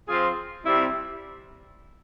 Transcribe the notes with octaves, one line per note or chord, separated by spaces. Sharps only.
F3 C4 F4 G#4
C3 G3 C4 E4